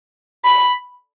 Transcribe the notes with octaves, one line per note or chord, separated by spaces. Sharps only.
B5